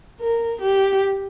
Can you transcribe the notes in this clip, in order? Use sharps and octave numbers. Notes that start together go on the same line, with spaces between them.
A#4
G4